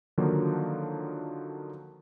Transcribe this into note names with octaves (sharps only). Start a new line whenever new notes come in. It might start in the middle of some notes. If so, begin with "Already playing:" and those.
D3 D#3 F3 F#3 A#3 D#4